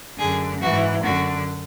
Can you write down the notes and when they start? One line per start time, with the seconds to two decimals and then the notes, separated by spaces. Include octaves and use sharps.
0.19 F#2 D3 G#4
0.61 G#2 E3 F#4
1.04 F#2 D3 F#4